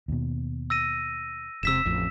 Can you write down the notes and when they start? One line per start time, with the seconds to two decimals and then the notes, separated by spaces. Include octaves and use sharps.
0.08 D#2 B2
0.70 E6 A#6 D#7
1.63 E1 C3 E6 B6 E7
1.85 A1 F2